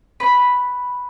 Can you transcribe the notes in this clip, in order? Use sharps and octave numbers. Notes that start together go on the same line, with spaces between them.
B4 B5